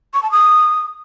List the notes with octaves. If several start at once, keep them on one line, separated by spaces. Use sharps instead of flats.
C#6
A5
D#6